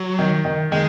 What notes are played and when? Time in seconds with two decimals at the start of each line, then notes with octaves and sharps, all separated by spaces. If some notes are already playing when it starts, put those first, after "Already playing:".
Already playing: F#3
0.19 D#3
0.45 D#3
0.72 D#3 G#3